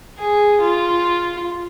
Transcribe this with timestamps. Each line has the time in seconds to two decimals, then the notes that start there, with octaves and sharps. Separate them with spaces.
0.19 G#4
0.61 F4